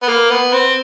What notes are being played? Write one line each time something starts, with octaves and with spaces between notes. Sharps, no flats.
B3
A#3
B3
C4